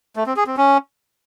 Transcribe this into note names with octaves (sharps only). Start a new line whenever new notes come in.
A3
C4
G#4
C4
C#4